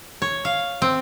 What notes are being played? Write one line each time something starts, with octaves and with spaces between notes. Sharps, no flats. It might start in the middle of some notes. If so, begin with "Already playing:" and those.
C#5
F5
C4